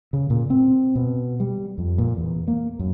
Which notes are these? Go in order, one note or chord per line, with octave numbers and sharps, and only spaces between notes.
C#3
A#2
C4
B2
G3
F2
A#2
E2
A#3
F#2